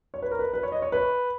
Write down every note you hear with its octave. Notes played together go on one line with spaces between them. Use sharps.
C#5
B4
A#4
B4
B4
C#5
D#5
C#5
B4